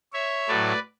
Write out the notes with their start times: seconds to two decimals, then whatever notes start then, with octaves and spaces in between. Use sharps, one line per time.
0.13 C#5 E5
0.48 A2 F#3 A3 B4 D5